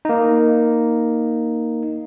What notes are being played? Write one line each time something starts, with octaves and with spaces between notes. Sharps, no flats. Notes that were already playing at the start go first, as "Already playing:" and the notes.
A#3 D#4